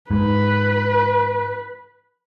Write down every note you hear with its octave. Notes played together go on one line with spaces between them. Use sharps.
G#2 B4